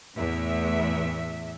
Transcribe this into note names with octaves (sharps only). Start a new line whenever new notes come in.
E2 A2 E5